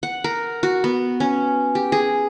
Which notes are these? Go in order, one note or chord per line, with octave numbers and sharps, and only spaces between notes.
F#5
A#4
F#4
B3
C#4
G4
G#4